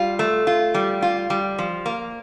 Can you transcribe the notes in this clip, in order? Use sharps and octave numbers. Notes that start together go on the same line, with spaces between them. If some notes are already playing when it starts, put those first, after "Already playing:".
Already playing: G3 F4
A3
F4
G3
F4
G3
F3
A#3